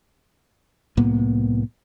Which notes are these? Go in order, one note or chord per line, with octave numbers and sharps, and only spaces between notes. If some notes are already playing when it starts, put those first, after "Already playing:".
C2 A2 A#3 B3